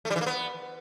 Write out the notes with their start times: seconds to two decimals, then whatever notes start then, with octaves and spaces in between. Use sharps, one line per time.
0.05 A3
0.10 G3
0.16 E3
0.21 A#3
0.26 B3